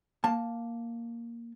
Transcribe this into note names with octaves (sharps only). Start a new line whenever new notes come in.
A#3 A5